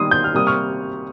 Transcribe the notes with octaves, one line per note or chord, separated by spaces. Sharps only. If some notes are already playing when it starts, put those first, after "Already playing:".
Already playing: D#3 G3 A#3 C6 D#6
G6
F6
C3 G3 A#3 D#6
C#6 F6